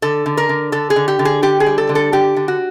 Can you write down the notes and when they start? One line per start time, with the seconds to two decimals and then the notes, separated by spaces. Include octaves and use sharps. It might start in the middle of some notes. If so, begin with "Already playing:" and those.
0.02 D3 A4
0.26 D3
0.37 A#4
0.49 D3
0.72 D3 A4
0.90 G#4
0.96 D3
1.08 G4
1.19 D3
1.25 G#4
1.42 D3 G4
1.60 G#4
1.66 G3
1.78 A4
1.89 D3
1.95 A4
2.12 D3 G4
2.36 D3
2.48 F#4